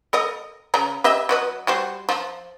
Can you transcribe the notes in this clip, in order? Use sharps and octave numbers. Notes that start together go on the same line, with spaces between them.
A4 A#4 D#5
C#3 A#5
G4 D#5 E5
F#3 B4 D#5
G3 F#4 C5
F3